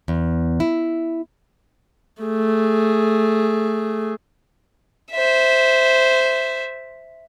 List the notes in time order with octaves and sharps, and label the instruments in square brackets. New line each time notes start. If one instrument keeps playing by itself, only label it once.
[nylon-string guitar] E2
E4
[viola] A3 G#4
[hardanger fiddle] C5 E5